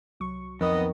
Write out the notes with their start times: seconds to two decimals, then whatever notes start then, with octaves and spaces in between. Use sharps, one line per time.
0.20 C2 F#3 C#6
0.61 F2 D#3 B3 D#5